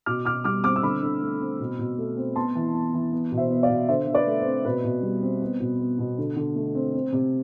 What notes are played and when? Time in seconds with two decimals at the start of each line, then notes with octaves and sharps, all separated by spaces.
0.06 B2 D6 F6
0.25 B2 D6 F6
0.44 G3 D6 F6
0.64 C4 D6 F6
0.76 E6
0.83 D3 B5 D6
1.02 D3
1.21 A3
1.41 C4
1.60 B2
1.79 B2
1.98 A3
2.17 C4
2.36 B3 A5 C6
2.55 E3
2.75 B3
2.94 E3
3.12 B3
3.32 B2
3.37 C5 E5
3.50 B3
3.63 D5 F5
3.69 B2
3.88 D3 C5 E5
4.07 D3
4.14 B4 D5
4.27 A3
4.40 C5
4.46 C4
4.65 B2 B4
4.84 B2
5.03 G3
5.22 C4
5.42 B3
5.60 B2
5.79 B3
5.98 B2
6.18 D3
6.36 D3
6.56 A3
6.75 C4
6.94 C4
7.12 C3